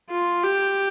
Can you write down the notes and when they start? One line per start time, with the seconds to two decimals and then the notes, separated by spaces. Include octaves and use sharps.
0.10 F4
0.43 G4